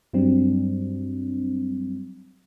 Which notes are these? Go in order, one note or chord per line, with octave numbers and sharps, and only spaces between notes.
G2 F#3 G3 C4 D4